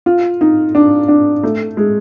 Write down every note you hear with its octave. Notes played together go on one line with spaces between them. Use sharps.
F4
D#4
D4
D4
A3
G#3